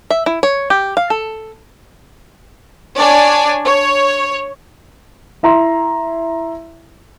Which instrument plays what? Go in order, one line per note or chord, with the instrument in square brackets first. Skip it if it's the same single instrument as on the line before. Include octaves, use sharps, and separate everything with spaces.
[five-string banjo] E5
E4
C#5
G4
F5
A4
[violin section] D4 C#5 D5 G#5
C#5
[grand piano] E4 E5 A#5 C6